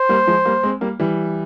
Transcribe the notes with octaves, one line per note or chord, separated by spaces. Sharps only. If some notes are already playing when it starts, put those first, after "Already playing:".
Already playing: C5
G3 A#3
F3 G#3
G3 A#3
G#3 C4
G3 A#3
E3 G3